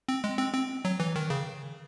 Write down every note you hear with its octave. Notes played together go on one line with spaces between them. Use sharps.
C4
G#3
C4
C4
F#3
E3
D#3
C#3